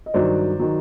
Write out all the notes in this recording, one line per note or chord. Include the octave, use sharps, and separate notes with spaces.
D#5
G2 D#3 F#3 C5 D5
D#3 F#3